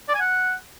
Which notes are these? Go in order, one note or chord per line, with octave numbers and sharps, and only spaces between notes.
D5
G#5
F#5